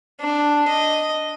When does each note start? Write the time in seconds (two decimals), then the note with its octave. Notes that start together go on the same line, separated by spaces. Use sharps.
0.21 D4
0.69 D#5